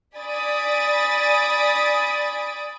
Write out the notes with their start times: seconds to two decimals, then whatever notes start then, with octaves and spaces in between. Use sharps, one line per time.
0.17 D5 G#5 B5 D#6 A6 D7